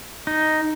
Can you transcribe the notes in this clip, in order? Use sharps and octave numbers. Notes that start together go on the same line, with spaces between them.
D#4